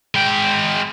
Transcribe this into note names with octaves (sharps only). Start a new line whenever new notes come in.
G#3 G5